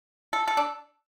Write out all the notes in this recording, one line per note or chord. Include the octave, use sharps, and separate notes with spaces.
A4
A4
D4